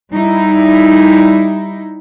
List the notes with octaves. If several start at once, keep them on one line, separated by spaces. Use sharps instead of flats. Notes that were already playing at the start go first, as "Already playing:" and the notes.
G3 D#4 E4